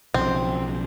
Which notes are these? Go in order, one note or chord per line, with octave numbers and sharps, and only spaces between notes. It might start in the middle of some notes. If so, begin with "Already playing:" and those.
B1 C#3 F3 C4